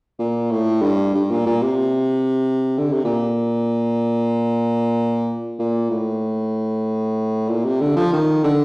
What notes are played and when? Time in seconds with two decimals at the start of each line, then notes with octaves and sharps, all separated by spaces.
0.19 A#2
0.51 A2
0.82 G2
1.14 G2
1.30 A#2
1.46 A#2
1.62 C3
2.78 D3
2.92 C3
3.04 A#2
5.59 A#2
5.90 A2
7.48 A#2
7.65 C3
7.81 D3
7.96 F3
8.13 D#3
8.44 D3